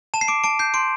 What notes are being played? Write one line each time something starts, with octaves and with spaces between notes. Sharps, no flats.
A5 E7
C7
D6 D7
A5 D7
G6 C7
C6 D7